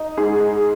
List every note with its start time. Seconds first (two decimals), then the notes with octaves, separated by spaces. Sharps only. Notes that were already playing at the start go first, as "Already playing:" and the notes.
Already playing: D#4
0.17 G#2 G#4
0.40 G#3